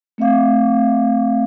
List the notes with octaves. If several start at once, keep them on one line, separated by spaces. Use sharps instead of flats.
A3 C4 E5 F5